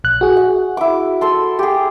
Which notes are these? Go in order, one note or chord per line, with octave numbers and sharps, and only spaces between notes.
A#1 F#6
F#4 G#4
F#5
E4 D6
A4 C6 E6
G4 G#4